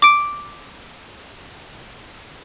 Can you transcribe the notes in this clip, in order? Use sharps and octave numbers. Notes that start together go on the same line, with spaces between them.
D6 D7